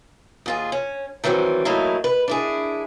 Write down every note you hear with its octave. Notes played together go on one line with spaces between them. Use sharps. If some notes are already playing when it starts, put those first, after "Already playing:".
D#2 F4 G#4
C#4
D#3 E3 F#3 G3 C4
E3 F#3 A3 A#3 D#4 E4
B4
D4 E4 G#4